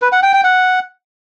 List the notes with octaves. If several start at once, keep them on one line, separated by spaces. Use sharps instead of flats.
B4
F#5
G5
G5
F#5